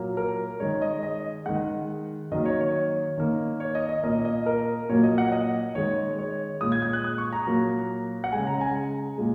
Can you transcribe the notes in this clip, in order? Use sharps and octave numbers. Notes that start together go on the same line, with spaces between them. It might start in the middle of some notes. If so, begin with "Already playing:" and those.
Already playing: A#2 F#3 A#3
A#4
D#3 G#3 C#5
D#5
D#5
D#3 G#3 F#5
D#3 F#3 A#3 D#5
C#5
C#5
D#3 A#3
C#5
D#5
D#5
A#2 A#3 D#5
D#5
A#4
A#2 F#3 A#3 C#5
D#5
F#5
D#5
D#3 G#3 C#5
C#5
A#2 G#3 D#6
G#6
G#6
F#6
D#6
C#6
A#5
A#2 F#3 A#3
F#5
C#3 G#3 G#5
A#5
G#5
A#2 G#3